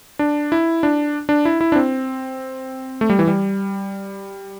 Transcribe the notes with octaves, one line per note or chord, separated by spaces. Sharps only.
D4
E4
D4
D4
E4
E4
D4
C4
A3
G3
E3
G3